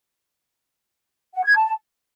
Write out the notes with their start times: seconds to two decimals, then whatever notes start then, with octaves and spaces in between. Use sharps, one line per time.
1.34 F#5
1.45 G#6
1.56 A5